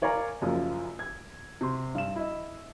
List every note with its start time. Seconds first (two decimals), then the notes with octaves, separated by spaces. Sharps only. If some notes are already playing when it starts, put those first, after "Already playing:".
0.02 A#4 C#5 D5 F5 G#5 A#5
0.42 F#1 F#2 F3
0.99 G#6
1.61 C3 C6
1.95 G2 E7
2.16 E4 D#5